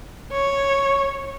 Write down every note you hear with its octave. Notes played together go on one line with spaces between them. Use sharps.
C#5